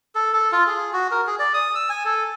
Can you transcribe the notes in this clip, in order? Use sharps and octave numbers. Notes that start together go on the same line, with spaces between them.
A4
A4
F4
G#4
F#4
A#4
G#4
D5
D#6
E6
G#5
A4